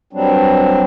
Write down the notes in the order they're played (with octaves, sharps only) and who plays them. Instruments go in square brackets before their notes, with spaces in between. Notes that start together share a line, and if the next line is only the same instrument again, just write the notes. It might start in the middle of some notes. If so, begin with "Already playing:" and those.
[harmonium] G2 F#3 G3 C4 D4